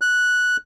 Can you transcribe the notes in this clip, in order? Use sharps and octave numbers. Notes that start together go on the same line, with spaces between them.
F#6